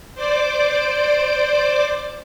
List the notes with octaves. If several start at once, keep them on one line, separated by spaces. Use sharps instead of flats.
C5 D5 D6